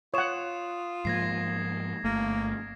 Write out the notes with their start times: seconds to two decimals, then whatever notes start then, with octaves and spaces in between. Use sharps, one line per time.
0.14 F4 C#5 F#5 D#6 E7
1.05 G#2 F3 A#3 G#6 A#6 C7
2.04 G1 A3 A#3